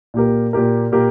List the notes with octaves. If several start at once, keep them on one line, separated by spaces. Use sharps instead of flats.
A#2 A#3 G4 A#4
A#2 A#3 G4 A#4
A#2 A#3 G4 A#4